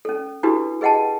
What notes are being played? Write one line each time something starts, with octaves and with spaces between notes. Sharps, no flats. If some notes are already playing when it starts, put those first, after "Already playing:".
C#4 A4
D4 E4 F#4 G4 A4 B4
G#4 B4 D#5 F#5 G5 A5